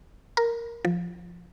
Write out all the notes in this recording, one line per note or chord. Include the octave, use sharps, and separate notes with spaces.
A#4
F3